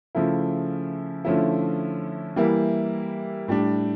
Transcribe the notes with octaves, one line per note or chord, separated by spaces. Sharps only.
C#3 F3 A3 E4
D3 F3 A3 C#4 E4
E3 G3 A#3 E4
A2 G3 D4